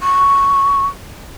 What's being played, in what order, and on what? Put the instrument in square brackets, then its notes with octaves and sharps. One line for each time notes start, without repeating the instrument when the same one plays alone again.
[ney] C#6